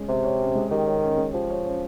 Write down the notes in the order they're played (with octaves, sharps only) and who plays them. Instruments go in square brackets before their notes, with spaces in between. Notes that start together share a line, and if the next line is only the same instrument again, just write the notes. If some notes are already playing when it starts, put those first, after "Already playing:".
Already playing: [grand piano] G#3 C#4
[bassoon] C3 [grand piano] G4
[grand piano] C#5
C#4
G#3
[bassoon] D#3 [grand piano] G4
[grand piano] C#5
C#4
G#3
[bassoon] F3 [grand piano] G4
[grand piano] C#5
C#4